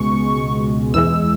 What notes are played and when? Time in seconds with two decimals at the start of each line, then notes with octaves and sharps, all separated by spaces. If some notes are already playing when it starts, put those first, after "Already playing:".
Already playing: C#2 B2 G#3 C#6
0.94 E2 E3 G#3 E6